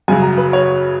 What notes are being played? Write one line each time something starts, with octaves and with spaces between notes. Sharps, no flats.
F#2 C#3 F#3 G#5
A#5
B4
C#5